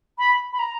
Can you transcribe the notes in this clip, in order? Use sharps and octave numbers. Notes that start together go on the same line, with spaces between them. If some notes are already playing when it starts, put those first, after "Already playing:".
B5
B5
A#5